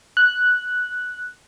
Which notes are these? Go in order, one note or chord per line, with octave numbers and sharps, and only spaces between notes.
F#6